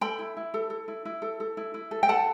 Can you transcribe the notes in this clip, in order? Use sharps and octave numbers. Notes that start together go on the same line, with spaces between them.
A4 G5 B5
E4
E4
A4
A4
E4
E4
A4
A4
E4
E4
A4
G5
A4 F#5 A5